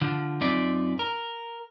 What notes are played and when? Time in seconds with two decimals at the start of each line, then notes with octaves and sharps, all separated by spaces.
0.01 D3 F3
0.41 F#2 C4 D#4 F4 D5 E5
0.99 A#4